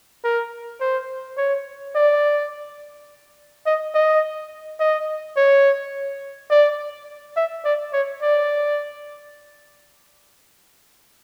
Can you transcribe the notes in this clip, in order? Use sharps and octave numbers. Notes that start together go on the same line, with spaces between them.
A#4
C5
C#5
D5
D#5
D#5
D#5
C#5
D5
E5
D5
C#5
D5